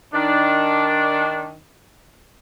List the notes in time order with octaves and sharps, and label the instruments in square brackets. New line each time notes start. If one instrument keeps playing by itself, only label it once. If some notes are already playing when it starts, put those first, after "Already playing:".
[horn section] D#3 D4